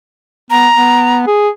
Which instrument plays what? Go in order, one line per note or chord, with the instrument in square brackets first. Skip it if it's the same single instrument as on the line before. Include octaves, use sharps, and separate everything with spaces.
[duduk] B3 [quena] A#5
[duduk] B3
G#4